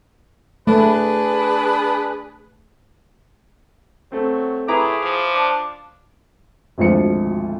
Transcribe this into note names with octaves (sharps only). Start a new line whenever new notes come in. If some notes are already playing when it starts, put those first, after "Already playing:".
A3 D4 G#4 B4
F#3 A3 C4
A2 E4 G#4 B4 A#5 D6
F3
D4
G#1 D2 F3 C#7